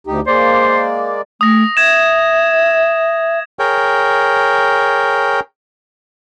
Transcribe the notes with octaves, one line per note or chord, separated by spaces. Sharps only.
D2 D#4 G4
G#3 A#3 C5 D5
A3 D#6 A#6
E5 G#6 E7
G#4 A#4 C#5 G5